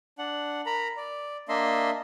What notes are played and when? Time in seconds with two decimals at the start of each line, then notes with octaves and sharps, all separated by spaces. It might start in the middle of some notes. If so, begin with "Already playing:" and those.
0.18 D4 F#5
0.66 A#4 A#5 B5
0.97 D5
1.49 A#3 D4 D#5 E5 C6